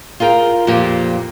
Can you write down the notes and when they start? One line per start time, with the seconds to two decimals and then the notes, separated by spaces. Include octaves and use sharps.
0.20 F4 G#4 A#4 G5
0.67 F2 A#2 F3 A#3 G4